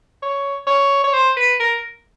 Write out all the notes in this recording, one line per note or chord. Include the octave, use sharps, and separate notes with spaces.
C#5
C#5
C#5
C5
B4
A#4